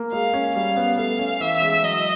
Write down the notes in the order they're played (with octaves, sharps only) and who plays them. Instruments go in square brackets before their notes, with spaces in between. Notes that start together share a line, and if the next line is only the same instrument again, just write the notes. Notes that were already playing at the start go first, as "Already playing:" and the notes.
Already playing: [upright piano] A#3
[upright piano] G#3 [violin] F5
[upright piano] C#4
[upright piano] G3 [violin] F5
[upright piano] B3
[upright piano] A3 [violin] F5
[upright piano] C#4
[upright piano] E3 [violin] E5
[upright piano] G#3
[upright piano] F#3 [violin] D#5